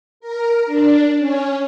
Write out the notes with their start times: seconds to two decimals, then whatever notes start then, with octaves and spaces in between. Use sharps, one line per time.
0.20 A#4
0.66 D4
1.19 C#4